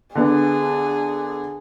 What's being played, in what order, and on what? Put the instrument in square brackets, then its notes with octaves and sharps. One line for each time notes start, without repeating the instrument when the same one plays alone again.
[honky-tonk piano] D3 B3 D4 [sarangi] G#4